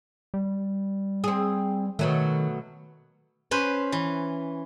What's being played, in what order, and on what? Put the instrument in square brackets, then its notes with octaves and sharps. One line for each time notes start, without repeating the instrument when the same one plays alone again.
[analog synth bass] G3
[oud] C4 G#4
[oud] B2 F#3 A3 [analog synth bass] D#3
[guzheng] C#4 B4 C5
E3